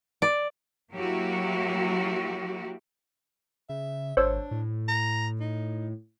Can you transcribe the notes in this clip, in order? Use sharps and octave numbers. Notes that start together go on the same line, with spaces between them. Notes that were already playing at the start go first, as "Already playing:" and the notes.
D5
F#3 A#3 E4 F#4 G4
C#3 E5
G#1 D4 C5 C#5 E6
A2
A#5
D#4